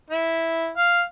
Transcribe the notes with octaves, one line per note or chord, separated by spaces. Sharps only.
E4
F5